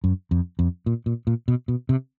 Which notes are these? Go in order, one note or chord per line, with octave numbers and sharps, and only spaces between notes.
F#2
F2
F2
A#2
A#2
A#2
B2
B2
C3